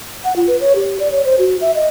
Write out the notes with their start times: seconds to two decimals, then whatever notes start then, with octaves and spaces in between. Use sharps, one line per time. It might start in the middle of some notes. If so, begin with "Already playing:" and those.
0.24 F#5
0.36 F4
0.48 B4
0.61 C#5
0.76 G4
1.00 D5
1.12 C#5
1.25 C5
1.39 F#4
1.61 E5
1.75 D#5